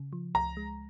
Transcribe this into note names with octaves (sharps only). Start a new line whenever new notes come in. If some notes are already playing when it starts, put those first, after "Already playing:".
Already playing: C#3
F3
C#2 A#5
G#3